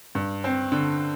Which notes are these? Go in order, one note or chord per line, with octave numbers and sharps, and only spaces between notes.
G2
C4
D3